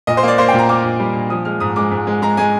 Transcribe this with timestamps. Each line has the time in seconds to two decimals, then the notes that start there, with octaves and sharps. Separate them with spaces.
0.07 A#2 D#5
0.17 C5
0.23 A#3 D5
0.38 A#3 C5
0.48 G5
0.53 A#2
0.59 A#5
0.69 A#3 D6
0.84 A#2
1.00 G3
1.15 A#2
1.30 F3 D#6
1.45 G#3 F6
1.60 G#2 D#6
1.76 G#3 D6
1.91 G#2
2.07 G#3
2.22 G#3 A#5
2.37 G#3 G#5